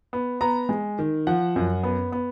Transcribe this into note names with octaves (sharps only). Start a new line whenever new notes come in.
B3
B3 A#5
G#3
D#3
F3 F#5
F#2
B3
B3